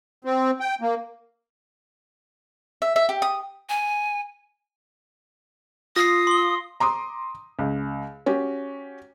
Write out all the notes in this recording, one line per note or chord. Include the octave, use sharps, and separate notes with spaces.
C4
G5
A#3
E5
E5
G4
D#6
G#5
F4 D#6 A#6 C7
C6 G7
A#5 C6 D6 D#6
C#2
C#4 F#4 G4